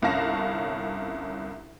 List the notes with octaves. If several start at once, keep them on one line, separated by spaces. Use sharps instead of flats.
G1 C2 C#4 F5 A5 A#6